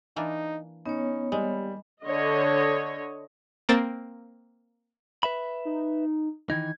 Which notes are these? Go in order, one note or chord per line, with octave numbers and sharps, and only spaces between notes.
E3 A#3 D4 D#4
B3 C#4 D#4 C#5
D#2 G3 G#3
D3 C#5 D#5
A#3 C4 A6 E7
B4 E5 B5
D#4
D#3 E3 D#4 G#6